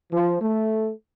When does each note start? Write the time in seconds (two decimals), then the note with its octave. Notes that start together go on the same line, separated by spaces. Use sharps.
0.10 F3
0.39 A3